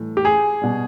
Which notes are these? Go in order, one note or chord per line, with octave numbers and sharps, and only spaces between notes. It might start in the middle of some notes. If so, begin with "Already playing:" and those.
Already playing: A2 E3 G3
G4
G#4
B2 G3